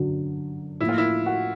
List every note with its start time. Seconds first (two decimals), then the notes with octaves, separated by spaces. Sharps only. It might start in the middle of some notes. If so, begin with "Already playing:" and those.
Already playing: F#2 D3 F#3
0.80 A2 F3 A#3 E4
0.89 F4
0.98 E4
1.26 F#4